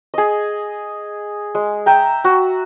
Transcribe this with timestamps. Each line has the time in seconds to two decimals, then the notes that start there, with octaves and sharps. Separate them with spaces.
0.14 G#4 D#5
1.55 G#3
1.86 E5 G5 A#5
2.24 F#4